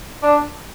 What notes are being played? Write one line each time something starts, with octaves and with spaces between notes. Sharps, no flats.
D4